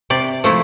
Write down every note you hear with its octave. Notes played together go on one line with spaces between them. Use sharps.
C3 D5
F3 A3 E4